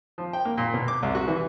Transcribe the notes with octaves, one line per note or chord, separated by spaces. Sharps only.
F3
G5
A#3
A#2
B2
D6
C2
F#4
E3